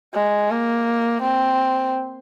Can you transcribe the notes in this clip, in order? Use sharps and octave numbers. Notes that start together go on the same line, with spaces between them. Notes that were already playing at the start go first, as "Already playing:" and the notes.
G#3
A#3
C4